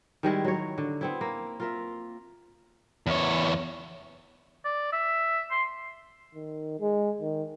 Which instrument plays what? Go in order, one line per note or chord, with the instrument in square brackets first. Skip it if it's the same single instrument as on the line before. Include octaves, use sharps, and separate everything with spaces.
[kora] D#3 G3 G#3 E4
F#3 C#5
D3
B3 C4 E4
A#3
F4 A#4 E5
[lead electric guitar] E2 C#5
[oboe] D5
E5
C6
[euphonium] D#3
G#3
D#3